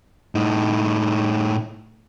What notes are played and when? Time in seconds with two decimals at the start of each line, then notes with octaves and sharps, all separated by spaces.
0.35 A2 D#4